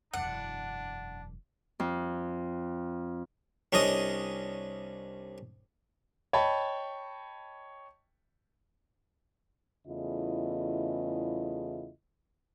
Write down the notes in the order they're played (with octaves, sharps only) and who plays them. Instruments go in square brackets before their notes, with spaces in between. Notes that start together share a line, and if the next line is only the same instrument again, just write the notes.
[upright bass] E1 F#2 [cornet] D4 [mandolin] F#5
[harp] F2
[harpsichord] C2 C#4 D4 D#5 D#6
[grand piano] C#5 D#5 G5 A5 B5
[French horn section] E2 C#3 A3 E4 F4 D#5